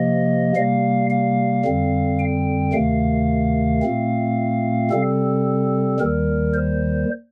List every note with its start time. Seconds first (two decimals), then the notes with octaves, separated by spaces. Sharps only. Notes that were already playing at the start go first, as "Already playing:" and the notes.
Already playing: C3 F3 A#3 D#5
0.56 C3 G3 A#3 F5
1.10 F5
1.64 F2 D3 G3 C4
2.19 G5
2.73 D2 C3 D#3 A3 F5
3.82 A#2 A3 C4
4.91 C3 G3 C4 A4
6.00 D#2 D#3 G3 A#4
6.54 C5